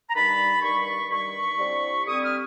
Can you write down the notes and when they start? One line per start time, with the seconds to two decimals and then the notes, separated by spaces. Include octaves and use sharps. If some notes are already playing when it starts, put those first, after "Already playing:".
0.10 A#5
0.15 G2 D#3 G3 A5 B5
0.62 G2 D#3 G3 B5 C#6
1.10 G2 D#3 G3 B5 C#6
1.59 D3 G3 C4 E4
2.06 D3 G3 C4 E4 C#6 D#6
2.23 D#6 F6